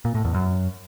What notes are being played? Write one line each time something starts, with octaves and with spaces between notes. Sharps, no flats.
A#2
A2
E2
F#2